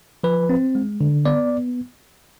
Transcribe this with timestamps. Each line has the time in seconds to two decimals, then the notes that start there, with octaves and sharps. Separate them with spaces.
0.24 F3 B4
0.49 C4
0.75 G#3
1.01 D3
1.26 B3 D5